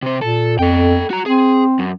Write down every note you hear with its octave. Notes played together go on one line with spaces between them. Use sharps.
C3 C5
A#2 A4
F2 A4 G5
F#4 A#5
C4 G#4
F#2